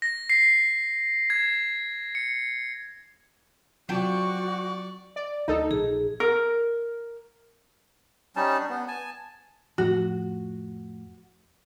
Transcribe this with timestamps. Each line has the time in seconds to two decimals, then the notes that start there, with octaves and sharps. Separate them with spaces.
0.02 A#6
0.30 C7
1.30 G#6
2.15 C#7
3.89 C3 F#3 F4 F#4 D5 G5 A5 C#6
5.16 D5
5.48 D2 D#4 A4
5.71 A#1 G#4
6.20 A#4
8.36 G3 C#4 D#4 A5
8.58 D4
8.69 B3
8.88 G#5 A5
9.78 F2 A2 F3 F#4